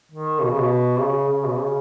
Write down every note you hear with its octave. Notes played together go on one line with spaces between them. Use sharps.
D#3
B2
C#3
B2
C#3
C#3
B2
C#3